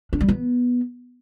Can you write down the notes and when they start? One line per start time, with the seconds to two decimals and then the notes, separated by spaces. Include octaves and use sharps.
0.13 D4
0.21 G3
0.28 B3